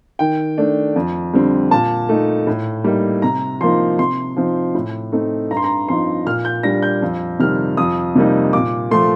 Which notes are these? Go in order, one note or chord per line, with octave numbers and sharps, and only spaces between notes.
D#3 G5
A3 D4
F2
D3 G3 C4
A#2 A5
A3 D#4
A2
G3 A#3 D#4
C3 A#5
F3 A#3 D#4 C6
C3 C6
F3 C4 D#4
A2
A3 C4 D#4
G2 A#5
C6
A#5
F3 C4 D#4 C6
A#2 F6
G6
G3 D4 A#6
G6
F2
C3 D#3 G3 F6
F2 D#6
C3 G3 A#3 D#4
A#2 D6
F3 A3 C6